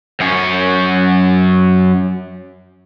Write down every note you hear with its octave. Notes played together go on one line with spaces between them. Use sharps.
F#2 C#4